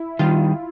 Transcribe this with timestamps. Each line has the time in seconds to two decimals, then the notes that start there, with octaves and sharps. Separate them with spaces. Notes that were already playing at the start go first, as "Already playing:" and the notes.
Already playing: E4
0.19 D#3 G3 F4